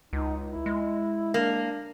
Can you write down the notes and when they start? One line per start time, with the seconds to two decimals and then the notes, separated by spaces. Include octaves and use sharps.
0.13 C#2 D#4
0.49 E4
0.66 G#3
1.34 A#3 D4